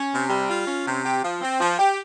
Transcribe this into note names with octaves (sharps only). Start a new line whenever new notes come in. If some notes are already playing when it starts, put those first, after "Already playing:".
Already playing: C#4
C3
G3
F4
C#4
C3
G4
F3
C4
F3
G4